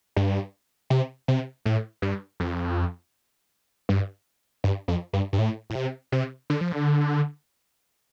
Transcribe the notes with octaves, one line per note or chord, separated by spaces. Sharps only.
G2
C3
C3
A2
G2
F2
G2
G2
F2
G2
G2
A2
A2
C3
C3
D3
F3
D3